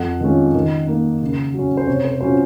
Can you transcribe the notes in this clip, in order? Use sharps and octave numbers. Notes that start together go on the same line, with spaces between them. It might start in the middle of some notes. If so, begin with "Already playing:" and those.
Already playing: F2 F#5
D#3 G#3 C#4 F4
D#3
A#3 D#4
C#3
F#3 C#4
C5
C3 C#5
C5
F#3 C#4 F4 C5